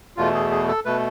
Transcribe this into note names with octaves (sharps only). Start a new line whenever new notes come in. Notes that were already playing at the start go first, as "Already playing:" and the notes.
E2 B2 A3 F4
G#4
G#4
A4
B2 A3 B4